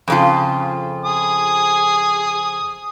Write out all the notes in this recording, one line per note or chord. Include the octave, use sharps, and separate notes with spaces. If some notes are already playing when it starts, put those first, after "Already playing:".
F2 C#3 F4
G#5 D#6